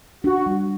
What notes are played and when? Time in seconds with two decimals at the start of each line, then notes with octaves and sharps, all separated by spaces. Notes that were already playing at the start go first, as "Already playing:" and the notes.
0.24 D4 F#4
0.46 G3